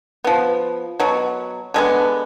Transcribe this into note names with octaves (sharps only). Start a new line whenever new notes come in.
F3 B3
B2 F#3
D3 G#3 B3